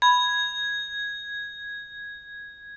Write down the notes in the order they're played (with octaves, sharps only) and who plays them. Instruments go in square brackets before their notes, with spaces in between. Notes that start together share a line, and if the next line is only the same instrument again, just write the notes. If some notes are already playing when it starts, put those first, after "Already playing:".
[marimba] B5 [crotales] G#6